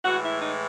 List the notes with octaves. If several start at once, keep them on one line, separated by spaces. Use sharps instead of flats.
A2 E3 G#3 F#4
E4
D#4